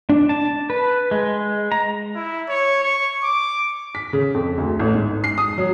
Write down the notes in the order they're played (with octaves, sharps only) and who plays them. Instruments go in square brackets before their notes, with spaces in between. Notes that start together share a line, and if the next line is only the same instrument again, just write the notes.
[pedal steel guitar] D4
A5
B4
G#3
A#5
[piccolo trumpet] E4
C#5
C#6
D6
[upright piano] B6
C#3
F2
D2
A1
G#2
C7
D#6
F#3